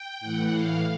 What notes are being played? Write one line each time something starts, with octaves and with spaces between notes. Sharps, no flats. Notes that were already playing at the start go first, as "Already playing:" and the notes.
Already playing: G5
A2 E3 F#5
F5